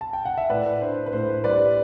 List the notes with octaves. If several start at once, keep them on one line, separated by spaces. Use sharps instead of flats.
A5
G5
F#5
E5
A2 B4 D5
D4 C5
B4
A2 C5
C5
G3 B4 D5